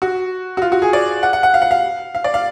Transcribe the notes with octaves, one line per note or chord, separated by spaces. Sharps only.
F#4
F#4
F4
F#4
G#4
D5
F#5
F#5
F#5
F5
F#5
F5
F5
D5
F5